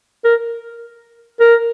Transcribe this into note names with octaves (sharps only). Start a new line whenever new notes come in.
A#4
A#4